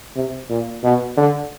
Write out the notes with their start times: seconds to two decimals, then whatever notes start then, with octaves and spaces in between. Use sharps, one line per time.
0.16 C3
0.50 A#2
0.83 B2
1.17 D3